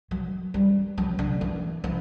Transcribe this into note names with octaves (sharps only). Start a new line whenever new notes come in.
F#3
G3
F#3
D3
E3
E3